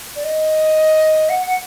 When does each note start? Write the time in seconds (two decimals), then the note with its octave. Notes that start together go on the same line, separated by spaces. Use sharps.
0.16 D5
0.24 D#5
1.29 F#5
1.47 F#5